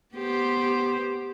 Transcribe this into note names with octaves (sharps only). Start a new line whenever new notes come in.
B3 G4 C5